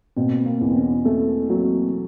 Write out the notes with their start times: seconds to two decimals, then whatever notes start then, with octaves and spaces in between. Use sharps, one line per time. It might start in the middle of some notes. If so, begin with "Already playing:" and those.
0.17 B2 A#3 C4
0.46 A#3 C4
0.61 E2
0.72 C4
0.77 B3 C#4
1.05 A3 A#3 C4
1.49 F#3 A#3 C4